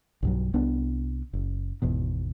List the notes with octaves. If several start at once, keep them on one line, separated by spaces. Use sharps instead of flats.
B1 G2 F#3
C2 B3 D4
F#1
G#1 E2 B2